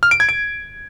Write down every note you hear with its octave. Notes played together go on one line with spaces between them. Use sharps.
F6
D7
G#6
D7